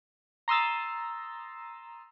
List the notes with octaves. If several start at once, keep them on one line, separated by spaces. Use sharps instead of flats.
A#5 C6 D#6 E6 A6